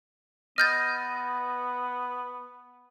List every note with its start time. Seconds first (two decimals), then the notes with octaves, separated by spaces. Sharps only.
0.58 B3 D#5 F6 G6 A6